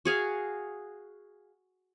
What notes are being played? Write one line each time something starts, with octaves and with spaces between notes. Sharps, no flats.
F#4 G#4 F5